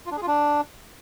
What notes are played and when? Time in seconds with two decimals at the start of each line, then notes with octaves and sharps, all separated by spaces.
0.06 F4
0.11 D4
0.17 G#4
0.22 F4
0.28 D4